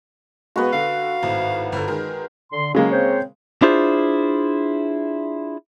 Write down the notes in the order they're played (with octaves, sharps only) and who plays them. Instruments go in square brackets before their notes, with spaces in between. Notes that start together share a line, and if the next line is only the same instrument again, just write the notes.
[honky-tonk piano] G#3 B3 [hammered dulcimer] F#4 B4
[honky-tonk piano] D3 [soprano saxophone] F5
[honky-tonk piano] G#1 A2
G1 D3
D#3 G#3 A#4
[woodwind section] D3 C6
[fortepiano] C#3 G#3 A#3 [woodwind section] F#3
[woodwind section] C4 C5 C#5
[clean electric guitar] D4 E4 F4 G#4 C5